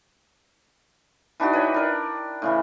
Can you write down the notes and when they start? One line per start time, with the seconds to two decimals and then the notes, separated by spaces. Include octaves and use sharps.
1.40 E3 D4 D#4 F#4
1.53 B4 C#5 G5
1.74 D4 A#4
2.42 A2 C#3 E3